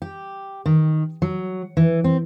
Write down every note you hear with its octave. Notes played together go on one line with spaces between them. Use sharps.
G4
D#3
F#3
E3
C4